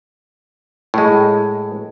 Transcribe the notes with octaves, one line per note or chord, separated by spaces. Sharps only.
A2 G#3